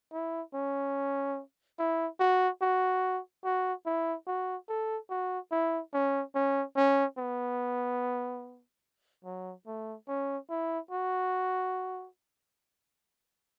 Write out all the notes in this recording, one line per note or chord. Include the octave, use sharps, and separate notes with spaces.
E4
C#4
E4
F#4
F#4
F#4
E4
F#4
A4
F#4
E4
C#4
C#4
C#4
B3
F#3
A3
C#4
E4
F#4